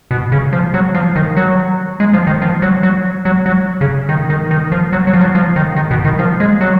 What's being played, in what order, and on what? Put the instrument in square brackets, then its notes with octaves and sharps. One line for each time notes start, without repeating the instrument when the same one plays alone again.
[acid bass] B2
C#3
F3
F#3
F3
D#3
F#3
G#3
F3
D#3
F3
F#3
F#3
F#3
F#3
C#3
D#3
D#3
D#3
F3
F#3
F#3
F3
F#3
F3
D#3
D#3
B2
D#3
F3
G#3
F#3